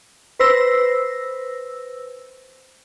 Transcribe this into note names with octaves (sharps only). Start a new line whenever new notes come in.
B4 C5 E6 A#6